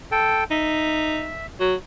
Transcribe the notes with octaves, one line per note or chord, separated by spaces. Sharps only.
A4 G5
D#4 E5
F#3